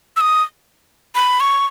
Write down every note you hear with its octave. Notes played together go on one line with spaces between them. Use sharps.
E6
D#6
B5
C#6